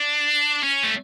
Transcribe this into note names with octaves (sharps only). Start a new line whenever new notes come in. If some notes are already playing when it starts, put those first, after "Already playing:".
Already playing: D4
C#4
A3